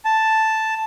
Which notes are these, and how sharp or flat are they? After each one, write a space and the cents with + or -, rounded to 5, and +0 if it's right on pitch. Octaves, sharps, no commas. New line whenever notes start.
A5 +0